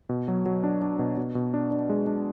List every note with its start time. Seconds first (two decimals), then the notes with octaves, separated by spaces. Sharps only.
0.09 B2
0.28 F#3
0.46 F#3
0.64 D4
0.82 D4
0.99 B2
1.17 B2
1.35 B2
1.54 D4
1.71 D4
1.89 G#3
2.07 D4